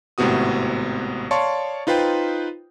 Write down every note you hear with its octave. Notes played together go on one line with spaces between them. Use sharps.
G#1 A2 C3 B3 F#4 D#6
C#5 D5 F5 A5 C6 C#6
D#4 F4 B4 C5 G5